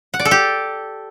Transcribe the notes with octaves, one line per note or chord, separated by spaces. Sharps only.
F#5
D5
A4
G4